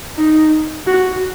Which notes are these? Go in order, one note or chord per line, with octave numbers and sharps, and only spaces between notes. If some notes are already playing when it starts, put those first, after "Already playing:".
D#4
F#4